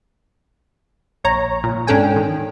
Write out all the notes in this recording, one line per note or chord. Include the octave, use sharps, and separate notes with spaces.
A#1 C#5 A#5
A#2
G#2 C#4 D4 A4 G5 G#5
D#3